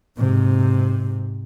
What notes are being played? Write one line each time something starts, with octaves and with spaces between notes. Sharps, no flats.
G#2 C3